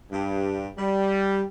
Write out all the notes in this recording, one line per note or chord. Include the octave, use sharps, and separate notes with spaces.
G2
G3